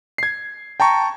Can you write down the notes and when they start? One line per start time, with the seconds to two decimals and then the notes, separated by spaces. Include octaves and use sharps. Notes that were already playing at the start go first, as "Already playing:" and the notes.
0.18 G#6 C7
0.80 G5 A5 A#5 C#6